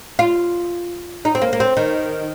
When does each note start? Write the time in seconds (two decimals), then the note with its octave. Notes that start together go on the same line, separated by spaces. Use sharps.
0.19 F4
1.25 D#4
1.35 C4
1.42 A#3
1.53 A#3
1.60 C4
1.77 D#3